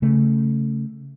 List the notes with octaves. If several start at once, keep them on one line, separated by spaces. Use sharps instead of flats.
C#3 A3